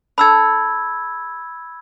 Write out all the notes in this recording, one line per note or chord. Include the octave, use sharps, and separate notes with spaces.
D4 A4 B5 E6 G#6